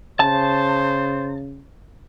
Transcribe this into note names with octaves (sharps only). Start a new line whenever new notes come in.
C#3 C5 A5